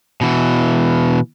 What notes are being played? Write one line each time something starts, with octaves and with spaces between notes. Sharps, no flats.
B2 E3